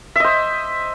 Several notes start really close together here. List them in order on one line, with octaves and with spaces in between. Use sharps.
E5 D#5 C5